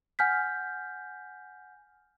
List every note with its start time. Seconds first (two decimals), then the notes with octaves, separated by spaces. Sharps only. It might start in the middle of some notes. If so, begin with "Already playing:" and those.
0.19 F#5 G#5 F6 G6 B6